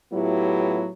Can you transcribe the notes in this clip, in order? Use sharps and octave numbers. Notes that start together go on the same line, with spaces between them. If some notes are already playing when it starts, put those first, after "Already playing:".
A2 F#3 B3 E4 F4 G4